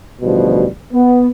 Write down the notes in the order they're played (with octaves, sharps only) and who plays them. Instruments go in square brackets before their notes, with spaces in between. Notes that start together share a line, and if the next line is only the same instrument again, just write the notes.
[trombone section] A1 D2 B2 F3 G3
B3